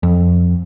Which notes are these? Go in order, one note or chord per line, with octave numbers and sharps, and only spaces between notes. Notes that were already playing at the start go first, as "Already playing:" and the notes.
F2